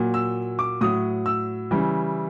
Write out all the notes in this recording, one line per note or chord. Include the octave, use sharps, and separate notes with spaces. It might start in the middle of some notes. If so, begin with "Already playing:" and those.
Already playing: A#2 F#3
E6
D6
A2 F#3 D#6
E6
C#3 E3 G3